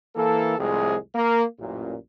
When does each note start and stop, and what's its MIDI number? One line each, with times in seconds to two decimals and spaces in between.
0.16 0.54 52
0.16 0.54 58
0.16 0.54 69
0.59 0.96 36
0.59 0.96 41
0.59 0.96 45
0.59 0.96 48
0.59 0.96 56
0.59 0.96 68
1.14 1.43 58
1.59 1.95 33
1.59 1.95 42
1.59 1.95 46